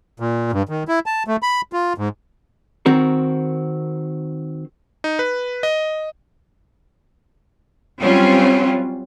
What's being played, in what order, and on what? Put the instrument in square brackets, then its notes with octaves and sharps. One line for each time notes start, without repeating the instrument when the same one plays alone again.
[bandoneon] A#2
G2
D#3
E4
A5
A3
B5
F4
G#2
[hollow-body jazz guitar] D#3 C4 F#4 A#4
[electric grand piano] D#4
B4
D#5
[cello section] F#3 G3 C4 C#4 F4